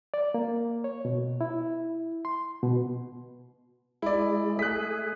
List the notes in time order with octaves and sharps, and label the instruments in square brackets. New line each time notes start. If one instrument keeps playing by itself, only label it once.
[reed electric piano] D5
A#3
C#5
B2
E4
C6
B2
[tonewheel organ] G#3 [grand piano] E4 D5
[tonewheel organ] A3 G#4 [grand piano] F#6 B6